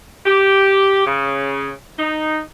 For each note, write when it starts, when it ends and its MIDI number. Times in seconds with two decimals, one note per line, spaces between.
0.26 1.05 67
1.06 1.72 49
1.99 2.40 63